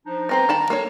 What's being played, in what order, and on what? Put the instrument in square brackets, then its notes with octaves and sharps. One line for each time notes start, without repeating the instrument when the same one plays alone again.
[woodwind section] F3 D4 D#4
[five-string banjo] B3 C4 C5 [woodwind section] A#5
[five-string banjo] D#3 A5 B5
A#3 A4 C#5